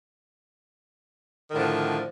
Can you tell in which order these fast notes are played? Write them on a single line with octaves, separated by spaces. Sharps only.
D#3 A2 D3 F3